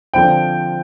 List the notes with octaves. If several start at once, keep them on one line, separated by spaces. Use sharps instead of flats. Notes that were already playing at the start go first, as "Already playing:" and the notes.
D3 F3 C4 G5